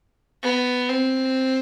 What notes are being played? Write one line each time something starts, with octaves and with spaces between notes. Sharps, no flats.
B3
C4